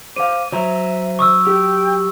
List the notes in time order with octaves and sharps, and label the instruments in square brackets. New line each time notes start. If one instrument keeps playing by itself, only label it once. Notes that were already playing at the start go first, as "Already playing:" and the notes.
[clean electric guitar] C5 F5 [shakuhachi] D6 [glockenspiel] D#7
[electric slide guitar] F#3 [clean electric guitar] C5 A#5 [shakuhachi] E5
[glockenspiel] C#6 D#6 E6
[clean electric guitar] G4 [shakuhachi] G5